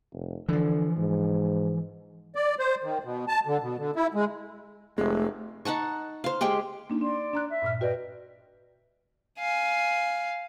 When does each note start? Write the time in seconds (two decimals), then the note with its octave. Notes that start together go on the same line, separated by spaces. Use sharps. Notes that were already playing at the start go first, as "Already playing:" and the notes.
0.13 F1
0.49 D3 E3 F3
0.97 G#2
2.35 D5
2.59 C5
2.83 D#3
3.04 B2
3.28 A5
3.47 D3
3.62 B2
3.78 D3
3.95 E4
4.14 G#3
4.98 F1 G#3 A3
5.65 D#4 F#5 A5 C#6
6.24 C5 F5
6.41 G#3 G4 G#4 G5
6.90 A#3 D4 D#4
7.01 D4 D5 C6
7.33 D4 A#5 F#6
7.49 E5
7.62 G2 A#2 F6
7.81 F#4 B4 D5 D#5 G5
9.39 F5 G#5